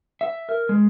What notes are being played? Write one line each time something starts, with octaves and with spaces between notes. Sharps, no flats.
E5
A#4
G#3